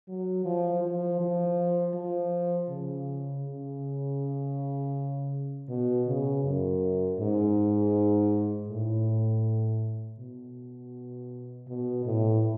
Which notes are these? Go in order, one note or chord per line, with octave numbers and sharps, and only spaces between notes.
F#3
F3
F3
F3
F3
C#3
C#3
B2
C#3
F#2
G#2
A2
B2
B2
A2